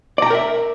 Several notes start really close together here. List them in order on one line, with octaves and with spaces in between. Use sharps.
D5 A#5 G5 A#4 E5